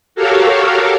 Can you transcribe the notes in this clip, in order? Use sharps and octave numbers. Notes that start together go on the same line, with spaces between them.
F#4 G4 A4 A#4 C#5 F5